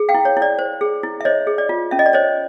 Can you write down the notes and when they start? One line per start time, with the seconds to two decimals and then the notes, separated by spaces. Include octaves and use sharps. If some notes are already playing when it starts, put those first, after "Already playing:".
Already playing: G#4
0.09 F5 G5
0.14 E4
0.25 C#5
0.37 E4
0.42 D5
0.59 C5
0.81 G#4
1.03 E4
1.21 E5
1.25 C5 C#5 D#5
1.47 G#4
1.58 D5
1.69 F4
1.91 C#4 E5
1.99 D#5
2.06 D5
2.13 C5 C#5 D#5